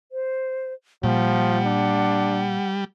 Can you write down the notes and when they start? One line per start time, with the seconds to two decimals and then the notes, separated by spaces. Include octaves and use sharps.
0.12 C5
1.03 A#2 F3 G3 F#5
1.65 D4